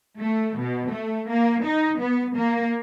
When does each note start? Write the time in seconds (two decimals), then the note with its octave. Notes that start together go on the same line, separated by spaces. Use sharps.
0.20 A3
0.59 B2
0.90 A3
1.30 A#3
1.65 D#4
2.00 B3
2.36 A#3